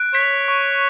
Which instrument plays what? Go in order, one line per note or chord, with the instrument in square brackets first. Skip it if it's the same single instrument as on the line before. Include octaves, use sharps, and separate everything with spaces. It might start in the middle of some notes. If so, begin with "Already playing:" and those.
Already playing: [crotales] F#6 D7
[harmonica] C#5 [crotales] B6
[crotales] C#6